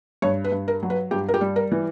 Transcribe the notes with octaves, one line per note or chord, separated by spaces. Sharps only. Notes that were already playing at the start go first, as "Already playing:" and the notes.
G2 C#5
B4
G2
A#4
F#3
B4
G2 G4
A#4
G4
G3
A#4
E3